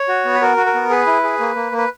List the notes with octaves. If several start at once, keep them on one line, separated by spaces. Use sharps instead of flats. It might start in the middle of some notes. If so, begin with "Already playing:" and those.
Already playing: C#5
F#4
B3
B4
F#4 A#4
F#4
A#4
B3
G#4 B4
E4
G#4
A#3
A#3
A#3
B4